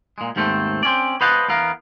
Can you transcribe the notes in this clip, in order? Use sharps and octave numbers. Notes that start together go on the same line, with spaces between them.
A#2 G#3
D#2 G#2 A3 C4 A4
C4 C#4 D5
B4 C5 D#5 F5 F#5 A5
E2 B3 A#4 F5